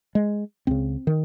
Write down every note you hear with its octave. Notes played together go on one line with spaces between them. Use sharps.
G#3
C#2 C#3 C4
D#3